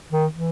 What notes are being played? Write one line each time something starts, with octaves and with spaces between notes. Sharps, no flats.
D#3
E3